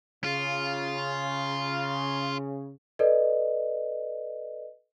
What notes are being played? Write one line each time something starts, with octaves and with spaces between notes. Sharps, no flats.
C#3 F4
A4 B4 D5 D#5